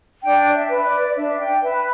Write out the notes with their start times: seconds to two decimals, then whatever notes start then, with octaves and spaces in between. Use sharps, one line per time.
0.22 D4 G5
0.47 D5
0.54 E5
0.69 B4
0.85 D5
1.16 D4 E5
1.39 G5
1.63 B4 E5